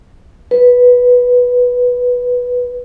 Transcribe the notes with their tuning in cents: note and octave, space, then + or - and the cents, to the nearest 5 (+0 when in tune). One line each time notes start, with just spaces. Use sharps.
B4 -5